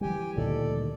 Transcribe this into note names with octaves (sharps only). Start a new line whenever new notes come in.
E3 G3 G4 G5 G#5
D2 A#2 D#3 A4 D5